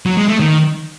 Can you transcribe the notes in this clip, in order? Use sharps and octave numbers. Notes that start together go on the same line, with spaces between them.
F#3
G#3
A3
D#3